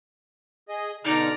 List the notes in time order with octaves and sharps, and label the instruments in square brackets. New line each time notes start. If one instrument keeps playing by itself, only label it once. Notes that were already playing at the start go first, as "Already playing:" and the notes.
[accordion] G#4 D#5
[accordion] B2 D3 F6 [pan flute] D#4 [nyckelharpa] D5 A#5